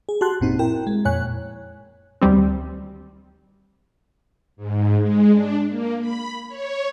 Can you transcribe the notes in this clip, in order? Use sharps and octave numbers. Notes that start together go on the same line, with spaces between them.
G#4
F#4 G4 A5 C6 F#6
G#1 F#2 A#2 C4 D#4
E4 A#4 G5
G#3
F2 A#2 C#5 G#5 F#6
D2 D#3 G3 C4
G#2
G#3
D4
A#3
B5
C#5